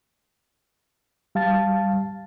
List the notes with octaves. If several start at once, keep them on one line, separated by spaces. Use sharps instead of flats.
G3 F5 A5 A6